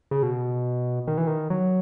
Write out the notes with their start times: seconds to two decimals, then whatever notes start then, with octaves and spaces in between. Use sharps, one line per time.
0.11 C#3
0.23 B2
1.08 D#3
1.18 E3
1.27 D#3
1.50 F#3